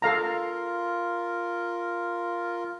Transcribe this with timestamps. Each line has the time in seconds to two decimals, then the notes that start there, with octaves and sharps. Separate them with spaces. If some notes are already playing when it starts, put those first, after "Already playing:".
0.02 F4 A4 A#4 F5 A#5